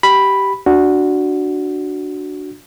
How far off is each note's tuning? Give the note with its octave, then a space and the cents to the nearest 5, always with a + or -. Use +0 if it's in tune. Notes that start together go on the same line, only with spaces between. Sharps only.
G4 -15 B5 +0
D4 +0 F#4 +0